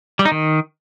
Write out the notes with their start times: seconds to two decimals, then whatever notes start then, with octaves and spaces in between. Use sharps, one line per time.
0.19 G3
0.25 D#4
0.32 D#3